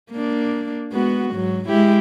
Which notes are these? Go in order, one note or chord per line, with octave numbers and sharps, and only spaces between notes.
A#3 D4
G#3 B3 F#4
G#2 F#3
G#3 E4 G4